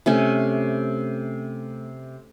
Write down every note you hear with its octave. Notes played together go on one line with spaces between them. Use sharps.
C3 A3 C#4